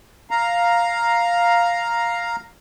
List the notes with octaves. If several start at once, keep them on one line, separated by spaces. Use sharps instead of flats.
F5 A#5